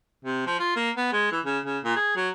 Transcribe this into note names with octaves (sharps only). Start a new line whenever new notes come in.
C3
F3
F4
A#3
B3
G#3
E3
C#3
C#3
A#2
G#4
F#3